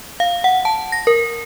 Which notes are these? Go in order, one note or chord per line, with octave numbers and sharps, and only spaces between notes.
F5
F#5
A5
A#6
A#4